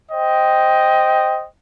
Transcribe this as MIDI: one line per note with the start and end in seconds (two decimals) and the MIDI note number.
0.11 1.45 72
0.11 1.45 75
0.11 1.45 79